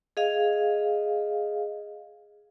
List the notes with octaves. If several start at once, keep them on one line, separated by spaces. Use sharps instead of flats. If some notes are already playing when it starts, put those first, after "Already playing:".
G#4 D#5 F5